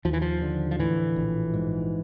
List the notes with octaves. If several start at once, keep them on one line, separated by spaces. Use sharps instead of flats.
D#2 F3
E3
F3
D3
F3
A2 E3
A#1
G#2